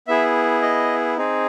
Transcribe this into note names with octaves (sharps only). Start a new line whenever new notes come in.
B3 E4 G#4 E5
D#5
C4 D#4 G#4